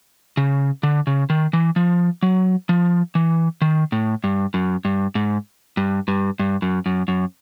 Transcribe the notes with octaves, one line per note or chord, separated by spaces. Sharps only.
C#3
D3
C#3
D#3
E3
F3
F#3
F3
E3
D#3
A2
G2
F#2
G2
G#2
G2
G2
G2
F#2
F#2
F#2